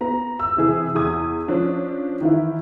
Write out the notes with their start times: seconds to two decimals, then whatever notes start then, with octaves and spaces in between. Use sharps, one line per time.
0.01 B3 A#5
0.39 E6
0.57 C3 E3 G#4
0.95 E2 G#4 D#6 G#6
1.48 F3 C#4 D4 C#5
2.21 D#3 E3 E4